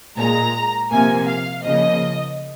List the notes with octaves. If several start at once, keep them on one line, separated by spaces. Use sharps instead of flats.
A#2 G#3 A#5
C3 F3 A#3 G#5
F5
C#3 F3 A#3 D#5